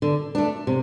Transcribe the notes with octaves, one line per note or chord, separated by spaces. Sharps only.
D3
A3 D4
C3